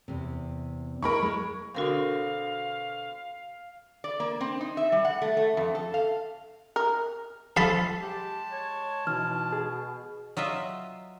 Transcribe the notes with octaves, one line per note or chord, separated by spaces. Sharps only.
E2 C3
E4 G#4 A#4 D#5 B5 C#6
G#3
B2 D3 C4 F#4 A#4 F5 C6
D5
A#3
C4
D#4
E5
G3
F#5
A3
A3
F2
A4
F5
A#4
F3 A4 F5 A5 B5
G#3 G4 A5
C#5
B2 E3 D#4 F6
G#4
F#3 F4 D#5 E5